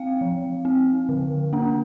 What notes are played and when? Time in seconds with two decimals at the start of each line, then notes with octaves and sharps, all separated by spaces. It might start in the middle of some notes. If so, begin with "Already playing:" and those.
Already playing: C4 F5 G5
0.21 F3
0.65 C4
1.09 D3
1.53 A#3 D4